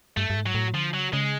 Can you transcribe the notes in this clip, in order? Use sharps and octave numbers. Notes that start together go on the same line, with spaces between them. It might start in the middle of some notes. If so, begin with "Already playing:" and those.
G2 A3
G2
G#2
F#3
A2
D3 F3
C#3 F#3
C#3 G#3